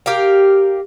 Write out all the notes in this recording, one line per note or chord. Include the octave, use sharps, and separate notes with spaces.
G4 A#4 F5